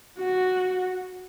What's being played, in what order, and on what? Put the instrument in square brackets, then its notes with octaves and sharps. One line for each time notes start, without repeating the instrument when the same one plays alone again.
[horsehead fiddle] F#4